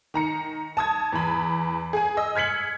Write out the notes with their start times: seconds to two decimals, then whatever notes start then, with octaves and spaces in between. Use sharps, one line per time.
0.14 D#3 A#5 C#7
0.77 A5 D#6 G#6
1.12 E2 B5
1.93 G#4 G#5
2.17 D#5 E6
2.36 F6 G#6 B6 C#7 F#7